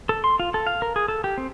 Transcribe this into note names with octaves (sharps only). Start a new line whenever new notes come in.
A4
C6
F4
A4
F5
A#4
G#4
A4
G4
C4